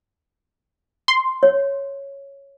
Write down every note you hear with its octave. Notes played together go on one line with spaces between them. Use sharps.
C6
C#5